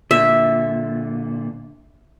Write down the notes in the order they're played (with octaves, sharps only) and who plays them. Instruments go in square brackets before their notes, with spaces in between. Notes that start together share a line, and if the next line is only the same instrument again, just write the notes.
[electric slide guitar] A#2 D3 [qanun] E5